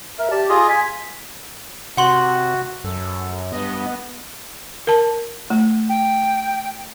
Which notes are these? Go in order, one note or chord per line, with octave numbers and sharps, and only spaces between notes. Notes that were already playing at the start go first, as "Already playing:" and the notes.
A#4 E5
G4 D5 A5
F4 G#4 D#5
G#5 B6
C3 F#4 F#5 C6 F#7
F#2 A4
G2 B3 D#5
A#4 A5
A3
G5